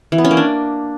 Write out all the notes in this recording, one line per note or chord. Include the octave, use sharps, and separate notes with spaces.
E3
B3
C#4
A#3
D4